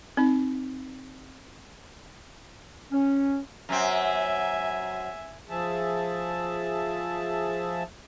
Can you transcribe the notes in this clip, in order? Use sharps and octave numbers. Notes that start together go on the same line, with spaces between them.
C4 D#4
C#4
F#2 C4 E5 G#5
F3 G#4 E5 A5